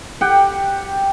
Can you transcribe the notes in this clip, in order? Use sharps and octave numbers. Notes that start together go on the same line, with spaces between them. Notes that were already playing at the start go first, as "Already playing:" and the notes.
G4 F#5 G5